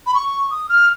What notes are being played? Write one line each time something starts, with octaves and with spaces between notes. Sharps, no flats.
B5
C#6
D#6
F6